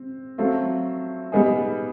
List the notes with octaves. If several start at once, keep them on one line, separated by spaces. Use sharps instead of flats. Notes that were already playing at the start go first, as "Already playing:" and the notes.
Already playing: C4
F#3 A3 C4 F4
G3 B3 D#4 G#4